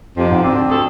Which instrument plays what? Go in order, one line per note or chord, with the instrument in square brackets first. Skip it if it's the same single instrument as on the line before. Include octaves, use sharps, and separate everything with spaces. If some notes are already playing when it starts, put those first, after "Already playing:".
[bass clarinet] F2 [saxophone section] C3 F3
[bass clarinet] G#2
[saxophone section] D2 D4 [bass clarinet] C4
[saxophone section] D2 G#4 A4